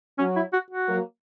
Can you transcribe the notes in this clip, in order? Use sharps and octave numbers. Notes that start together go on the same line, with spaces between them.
F#3 C#4
E4
F#4
F#4
F#3 A#3